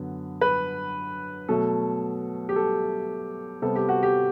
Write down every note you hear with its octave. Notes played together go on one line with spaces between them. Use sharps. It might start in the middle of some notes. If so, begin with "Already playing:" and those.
Already playing: F#2 D3 F#3 B3
B4
B2 F#3 A3 A4
G4
A4
C3 G3 B3 A4
G4
F#4
G4